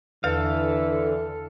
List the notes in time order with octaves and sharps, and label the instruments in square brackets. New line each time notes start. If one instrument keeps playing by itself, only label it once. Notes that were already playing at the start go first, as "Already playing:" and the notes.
[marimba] E2 B4 [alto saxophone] D3 [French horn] E3 [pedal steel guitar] A4 F5